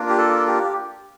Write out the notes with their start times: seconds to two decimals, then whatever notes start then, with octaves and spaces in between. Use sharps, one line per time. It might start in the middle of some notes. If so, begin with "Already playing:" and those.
Already playing: A#3 D4 F4
0.09 G4
0.18 A4
0.47 G4